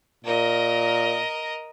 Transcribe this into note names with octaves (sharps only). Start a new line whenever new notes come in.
A#2 A#4 D#5